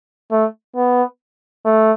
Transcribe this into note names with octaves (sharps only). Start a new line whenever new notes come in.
A3
B3
A3